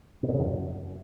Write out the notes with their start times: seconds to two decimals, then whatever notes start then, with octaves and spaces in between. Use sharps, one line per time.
0.23 B2
0.28 A#2
0.34 C#3
0.40 E2
0.45 F#2